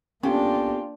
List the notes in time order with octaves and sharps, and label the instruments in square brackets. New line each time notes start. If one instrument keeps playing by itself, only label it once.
[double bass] A#3 D4 [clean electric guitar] B3 G4 A4 [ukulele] C#4 [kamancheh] F4 G5